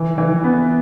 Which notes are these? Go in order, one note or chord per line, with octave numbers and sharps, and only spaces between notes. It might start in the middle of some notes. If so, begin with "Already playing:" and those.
Already playing: E3
E3
B3